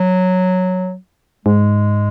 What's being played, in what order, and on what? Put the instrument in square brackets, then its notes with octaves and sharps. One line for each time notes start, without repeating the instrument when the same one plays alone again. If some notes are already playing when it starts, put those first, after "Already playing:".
Already playing: [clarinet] F#3
[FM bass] G#2 [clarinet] G#3